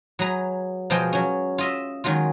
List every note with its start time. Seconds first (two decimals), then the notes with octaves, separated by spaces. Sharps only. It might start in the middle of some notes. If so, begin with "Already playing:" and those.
0.19 F#3 G#4 B4 A#5
0.90 B2 F3 G#3 G#4 G5
1.13 F#3 C#4
1.58 F4 D#5 E5
2.04 D#3 F#3 G#3 F4